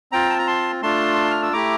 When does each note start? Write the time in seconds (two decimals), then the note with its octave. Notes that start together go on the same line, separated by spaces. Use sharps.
0.12 C4 F4 G5 A#5
0.30 A5
0.39 A#5
0.47 A5 C6
0.82 A3 D4 F4 A5 C6
1.31 F6
1.42 E6
1.52 A3 E4 G4 A#5 D6